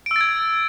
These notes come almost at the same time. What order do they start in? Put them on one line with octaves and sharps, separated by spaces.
D7 E6 A6 G#6